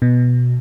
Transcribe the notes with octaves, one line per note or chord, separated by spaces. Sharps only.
B2